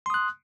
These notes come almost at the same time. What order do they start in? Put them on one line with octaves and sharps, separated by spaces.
C6 D#6 F#6